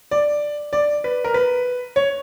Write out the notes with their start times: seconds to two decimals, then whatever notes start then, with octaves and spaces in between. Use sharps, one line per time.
0.11 D5
0.73 D5
1.04 B4
1.24 A#4
1.34 B4
1.96 C#5